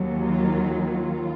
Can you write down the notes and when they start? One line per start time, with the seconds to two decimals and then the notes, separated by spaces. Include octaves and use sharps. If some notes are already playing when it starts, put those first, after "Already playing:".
Already playing: D#2 D#3 F#3
0.24 F4
0.77 F4